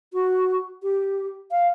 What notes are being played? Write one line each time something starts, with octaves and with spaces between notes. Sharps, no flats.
F#4
G4
F5